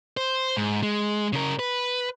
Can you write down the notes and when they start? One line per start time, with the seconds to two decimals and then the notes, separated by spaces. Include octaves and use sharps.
0.17 C5
0.57 G#2
0.83 G#3
1.33 C#3 A#4
1.59 B4